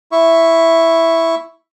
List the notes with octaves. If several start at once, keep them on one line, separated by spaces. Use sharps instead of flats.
E4 E5 C#6